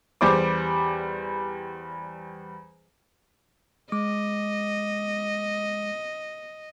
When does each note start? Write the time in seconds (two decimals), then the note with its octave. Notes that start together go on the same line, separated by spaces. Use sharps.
0.21 E2 G3 C5 D6
3.92 G#3 D#5 D6